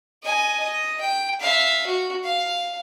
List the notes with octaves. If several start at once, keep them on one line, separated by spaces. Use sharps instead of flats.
D#5 G#5
D#5
G5
E5 F5
F#4
F5